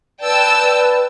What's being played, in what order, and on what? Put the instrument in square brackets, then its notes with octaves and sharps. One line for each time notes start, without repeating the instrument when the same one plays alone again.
[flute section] B4 D5 [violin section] G5 A5 E6